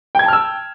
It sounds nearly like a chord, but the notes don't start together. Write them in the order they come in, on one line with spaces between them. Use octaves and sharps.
G5 G#6 A5 F6 E6